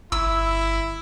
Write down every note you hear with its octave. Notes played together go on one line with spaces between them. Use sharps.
G1 E4 E6